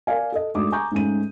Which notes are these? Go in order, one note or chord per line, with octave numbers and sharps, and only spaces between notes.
A#4 D5 F5 G#5
A4 D#5
G#2 A3 D4 F#4 D6 D#6
G#5 A#5 C#6 D6 G6
G#2 A3 C#4 D#7